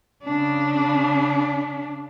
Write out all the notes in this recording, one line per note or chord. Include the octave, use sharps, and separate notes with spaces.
C#3 D4